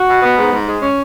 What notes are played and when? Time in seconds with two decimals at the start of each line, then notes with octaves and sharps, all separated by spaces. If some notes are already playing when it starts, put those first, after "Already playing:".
Already playing: F#4
0.08 B2
0.23 B3
0.38 G#2
0.53 G#2
0.68 G#3
0.82 C#4